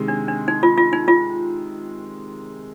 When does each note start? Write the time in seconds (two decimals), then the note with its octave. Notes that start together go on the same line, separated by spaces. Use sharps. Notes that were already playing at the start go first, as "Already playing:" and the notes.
Already playing: C3 D#3 G#3
0.08 D4
0.28 D4
0.48 D#4
0.63 F4
0.78 F4
0.93 D#4
1.08 F4